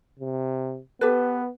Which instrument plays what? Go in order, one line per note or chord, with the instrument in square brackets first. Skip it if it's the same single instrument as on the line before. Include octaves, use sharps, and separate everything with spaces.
[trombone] C3
[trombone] B3 [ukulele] G4 A4 B4